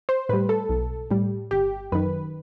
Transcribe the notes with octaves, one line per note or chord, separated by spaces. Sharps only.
C5
A2 G3 B4
A4
B1
A2 G3
G1 G4
F#2 D#3 B4